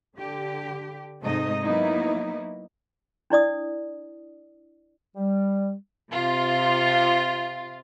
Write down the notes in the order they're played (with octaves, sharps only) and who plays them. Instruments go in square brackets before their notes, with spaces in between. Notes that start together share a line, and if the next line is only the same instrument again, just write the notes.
[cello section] D3 G4
G#2 C3 A3 D#4 D#5
F#3 A#3 B3 D#4 E4
[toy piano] D4 E4 D5 D#6
[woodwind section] G3
[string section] C3 F4